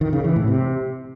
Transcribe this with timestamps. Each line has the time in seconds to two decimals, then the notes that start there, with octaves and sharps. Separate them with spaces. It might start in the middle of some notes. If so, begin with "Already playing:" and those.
0.01 D#3
0.13 C#3
0.24 E3
0.36 A2
0.48 C3